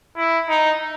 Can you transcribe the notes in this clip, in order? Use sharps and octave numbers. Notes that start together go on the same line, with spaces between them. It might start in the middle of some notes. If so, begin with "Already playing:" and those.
E4
D#4